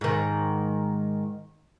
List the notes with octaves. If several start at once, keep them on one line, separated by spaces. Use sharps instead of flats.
G#2 D#3